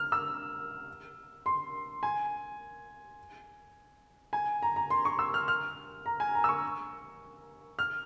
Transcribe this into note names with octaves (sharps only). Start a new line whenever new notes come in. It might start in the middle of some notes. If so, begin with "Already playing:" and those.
Already playing: F6
E6
C6
G#5
G#5
A#5
A#5
C6
C#6
E6
F6
F6
A#5
G#5
A#5
E6
C#6
F6